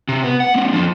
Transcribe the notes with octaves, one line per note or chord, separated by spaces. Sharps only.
C3
B3
F#5
A#3 C4
F3 C4